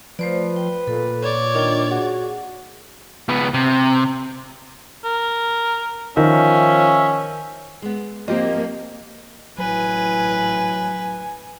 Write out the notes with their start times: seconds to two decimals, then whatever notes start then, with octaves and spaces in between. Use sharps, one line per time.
0.19 F3 A3 B4 C5 D5
0.56 G5
0.87 A#2 A4
1.22 C#5 D5
1.55 D#3 D4 F4
1.91 F#4 G#4
3.29 C#2 B3
3.54 C3
5.04 A#4
6.17 D#3 F3 C#4 E5
7.82 G#3 B3
8.28 F3 A#3 C4 G4 D#5
9.58 A1 F#3 E4 B4 G#5